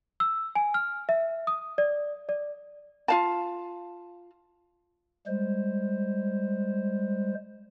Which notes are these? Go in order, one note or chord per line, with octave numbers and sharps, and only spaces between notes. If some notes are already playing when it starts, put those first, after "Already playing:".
E6
G#5
F6
E5
D#6
D5
D5
F4 F5 A5
G3 G#3 C5